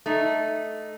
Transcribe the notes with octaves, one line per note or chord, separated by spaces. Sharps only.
A3 D#4